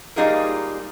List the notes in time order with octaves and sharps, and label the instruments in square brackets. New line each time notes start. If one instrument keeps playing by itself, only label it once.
[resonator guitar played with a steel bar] G3 A#3 D#4 F4 G#4 A#4